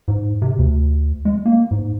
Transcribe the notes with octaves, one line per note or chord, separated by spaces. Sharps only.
G#2
C3
D2
G#3
A#3
G#2